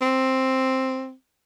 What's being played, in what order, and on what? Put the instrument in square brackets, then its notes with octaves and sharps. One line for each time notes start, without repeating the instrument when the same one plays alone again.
[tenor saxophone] C4